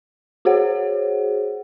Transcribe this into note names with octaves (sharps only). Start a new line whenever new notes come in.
F#4 G#4 C5 C#5 F#5